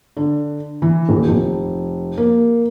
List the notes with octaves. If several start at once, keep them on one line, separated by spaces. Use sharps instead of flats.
D3
E3
D#1
F1
A#3